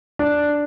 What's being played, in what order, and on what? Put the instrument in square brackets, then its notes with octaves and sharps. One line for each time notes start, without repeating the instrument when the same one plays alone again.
[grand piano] D4